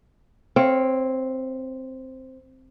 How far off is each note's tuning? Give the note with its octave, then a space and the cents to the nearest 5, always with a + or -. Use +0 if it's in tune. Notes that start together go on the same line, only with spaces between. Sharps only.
C4 +0 C#5 -20 F5 +0